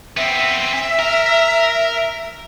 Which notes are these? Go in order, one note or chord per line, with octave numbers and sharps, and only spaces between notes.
B3 C4 E5
A#4